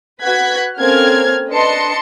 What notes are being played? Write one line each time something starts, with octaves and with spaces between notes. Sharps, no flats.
F#4 B4 F#5 F#6 G#6 B6
A#3 C4 C#4 A4 F6 G#6
D4 B4 D#5 A5 C6 C#7